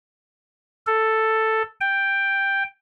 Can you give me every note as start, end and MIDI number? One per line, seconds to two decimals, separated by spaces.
0.87 1.63 69
1.81 2.63 79